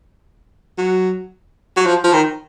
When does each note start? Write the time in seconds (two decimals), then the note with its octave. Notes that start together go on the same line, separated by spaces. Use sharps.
0.78 F#3
1.77 F#3
1.86 F3
2.04 F3
2.13 D#3